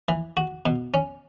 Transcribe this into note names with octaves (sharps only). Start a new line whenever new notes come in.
E3
F#4
B2
C#4